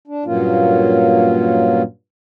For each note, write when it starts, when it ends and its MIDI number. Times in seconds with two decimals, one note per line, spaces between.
0.07 0.24 62
0.26 1.82 43
0.26 1.82 46
0.26 1.82 54
0.26 1.82 58
0.26 1.82 61
0.26 1.82 65